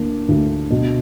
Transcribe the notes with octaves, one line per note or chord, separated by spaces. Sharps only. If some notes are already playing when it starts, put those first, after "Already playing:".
Already playing: D2 A#3 D4
D2
B2